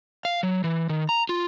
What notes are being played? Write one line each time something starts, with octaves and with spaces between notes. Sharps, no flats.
F5
F#3
E3
D#3
A#5
F4